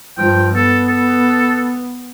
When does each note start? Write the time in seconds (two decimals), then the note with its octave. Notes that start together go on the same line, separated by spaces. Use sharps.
0.18 G2 F3 G5
0.56 B3 A4
0.88 A4